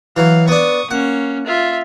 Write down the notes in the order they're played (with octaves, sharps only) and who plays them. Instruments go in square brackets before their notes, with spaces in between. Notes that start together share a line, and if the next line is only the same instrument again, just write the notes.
[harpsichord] E3 F#3 [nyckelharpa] F5
[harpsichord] B3 D4 [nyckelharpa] C#6 D#6
[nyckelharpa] A#3 C#4 [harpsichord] F#5
[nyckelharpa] F4 E5